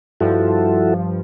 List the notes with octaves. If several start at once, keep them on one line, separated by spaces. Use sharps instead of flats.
G2 F3 E4 F#4 A4